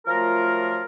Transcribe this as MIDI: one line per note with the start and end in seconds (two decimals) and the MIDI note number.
0.06 0.82 53
0.06 0.82 54
0.06 0.82 57
0.06 0.82 65
0.06 0.82 70